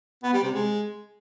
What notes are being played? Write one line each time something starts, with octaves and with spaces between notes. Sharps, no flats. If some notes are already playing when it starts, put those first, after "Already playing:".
B3
G3
C3
G#3